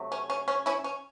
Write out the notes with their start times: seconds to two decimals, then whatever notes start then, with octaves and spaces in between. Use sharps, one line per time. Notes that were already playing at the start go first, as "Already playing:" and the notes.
Already playing: C3 F#3 A3
0.12 C#4
0.30 C#4
0.48 C#4
0.66 C#4 E4
0.84 C#4